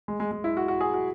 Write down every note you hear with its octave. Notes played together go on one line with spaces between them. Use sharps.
G#3
G#3
G#3
E4
F#4
F#4
G#4
F#4